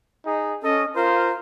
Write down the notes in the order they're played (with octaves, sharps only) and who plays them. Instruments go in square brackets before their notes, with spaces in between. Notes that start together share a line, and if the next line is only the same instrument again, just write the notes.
[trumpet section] D#4 G#4
[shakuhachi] C#4 [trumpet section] A4 D#5
[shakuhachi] F4 [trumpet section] A#4 C5